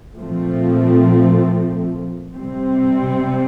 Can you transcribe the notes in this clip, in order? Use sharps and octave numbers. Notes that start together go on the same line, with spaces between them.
A#2 F3 A3 C4
C3 G3 C4